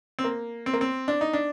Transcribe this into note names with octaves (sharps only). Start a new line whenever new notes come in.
C4
A#3
C4
A#3
C4
D4
D#4
D4